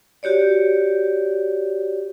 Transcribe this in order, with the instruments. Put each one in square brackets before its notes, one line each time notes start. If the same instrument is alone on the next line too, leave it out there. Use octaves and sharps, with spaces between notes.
[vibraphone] F#4 G4 C#5 D5